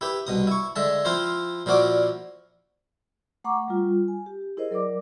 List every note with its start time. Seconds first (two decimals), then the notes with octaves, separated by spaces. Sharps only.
0.01 E4 G4 B4
0.27 C2 B2 D#6
0.47 E4 C#6
0.76 D3 G#3 E5 A5
1.05 F3 C4 E4 F4 C5
1.66 A#2 F3 E4 F#4 D5 D6
3.44 A3 F#5 A#5 C#6 D6
3.68 G3 F4
4.08 G#5
4.26 G4
4.57 E4 G#4 A#4 C5 D#5
4.71 F#3 A#4 D5 D6